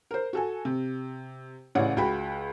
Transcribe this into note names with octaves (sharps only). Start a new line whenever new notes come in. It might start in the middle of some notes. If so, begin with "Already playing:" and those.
A#4 C5
F#4 A4 G#5
C3
A1 C#3 E4 C#5 D5 F#5
C#2 F#4 G5 B5